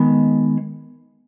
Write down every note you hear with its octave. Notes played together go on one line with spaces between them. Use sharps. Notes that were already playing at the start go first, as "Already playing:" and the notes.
Already playing: D#3 G#3 B3